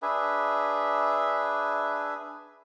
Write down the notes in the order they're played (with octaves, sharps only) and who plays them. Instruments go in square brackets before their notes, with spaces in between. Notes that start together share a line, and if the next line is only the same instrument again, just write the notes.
[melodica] D4 G#4 B4 E5